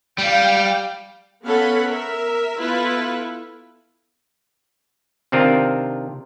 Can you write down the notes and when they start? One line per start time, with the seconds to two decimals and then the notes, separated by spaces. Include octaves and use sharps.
0.18 G3 F5 G5
1.45 B3 C#4 A4 F5 F#5 B5
1.88 A#4 E5
2.59 B3 E4 F4 A4 B4
5.32 C3 D#3 C4 D4 F4 A#4